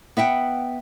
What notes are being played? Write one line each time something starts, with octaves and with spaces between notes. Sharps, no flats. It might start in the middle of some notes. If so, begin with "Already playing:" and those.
B3 E5 F#5 G5